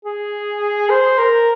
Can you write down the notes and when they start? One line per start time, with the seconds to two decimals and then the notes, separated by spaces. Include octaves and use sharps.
0.05 G#4
0.90 C5
1.18 A#4